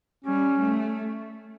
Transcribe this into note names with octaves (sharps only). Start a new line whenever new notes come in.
G3 C#4
A3